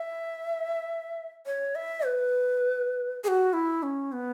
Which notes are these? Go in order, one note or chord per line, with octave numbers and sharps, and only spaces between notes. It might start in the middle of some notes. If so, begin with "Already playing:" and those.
Already playing: E5
C#5
E5
B4
G#4
F#4
E4
C#4
B3